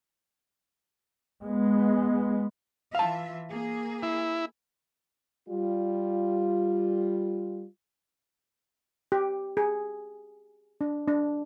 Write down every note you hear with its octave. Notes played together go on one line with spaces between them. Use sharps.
G#3 B3
E3 F4 E5 F5 A5
A#3 G#4
E4
G3 F4
G4
G#4
D4
D4